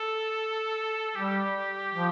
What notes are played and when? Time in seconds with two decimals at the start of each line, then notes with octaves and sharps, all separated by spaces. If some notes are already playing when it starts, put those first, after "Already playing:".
Already playing: A4
1.15 G3 G4
1.95 F3